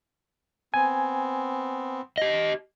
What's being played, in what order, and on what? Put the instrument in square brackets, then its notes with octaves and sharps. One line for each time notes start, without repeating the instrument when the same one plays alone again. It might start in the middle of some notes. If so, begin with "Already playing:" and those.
[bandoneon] B3 C4 [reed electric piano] G#5
[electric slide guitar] G4 D#5